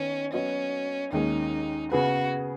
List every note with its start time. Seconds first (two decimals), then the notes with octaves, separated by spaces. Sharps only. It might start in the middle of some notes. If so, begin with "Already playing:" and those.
Already playing: D#3 B3 C#4
0.33 F#3 B3 C#4 F#4 D#5
1.12 D#2 D#3 G#3 C#4 D#4 G#4
1.91 C#3 B3 F#4 G#4 B4